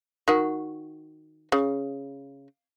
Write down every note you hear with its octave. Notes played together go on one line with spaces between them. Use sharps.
D#3 F#4
C#3